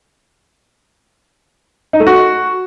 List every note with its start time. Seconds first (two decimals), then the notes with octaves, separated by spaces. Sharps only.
1.93 D#4
2.00 A3
2.07 F#4